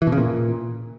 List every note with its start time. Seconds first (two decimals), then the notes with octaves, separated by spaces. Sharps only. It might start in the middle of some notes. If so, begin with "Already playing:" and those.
0.02 E3
0.07 B2
0.12 C#3
0.18 A#2